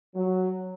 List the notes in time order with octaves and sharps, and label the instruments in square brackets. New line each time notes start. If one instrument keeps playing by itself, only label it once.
[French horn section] F#3